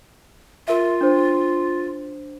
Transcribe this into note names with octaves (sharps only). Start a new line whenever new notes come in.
F4 A#4 E5
D4 C5